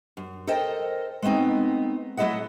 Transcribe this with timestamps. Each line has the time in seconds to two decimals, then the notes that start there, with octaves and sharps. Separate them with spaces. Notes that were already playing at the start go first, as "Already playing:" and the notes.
0.17 F#2
0.47 A4 A#4 C5 D#5 G5 A5
1.22 G#3 A3 B3 C4 D#4
2.17 F#3 A3 E4 A4 D#5 F#5